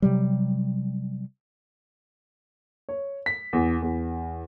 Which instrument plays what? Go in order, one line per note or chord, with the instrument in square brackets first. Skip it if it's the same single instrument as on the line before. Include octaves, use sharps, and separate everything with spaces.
[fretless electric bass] C3 F#3 G3
[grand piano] C#5
B6
E2
E2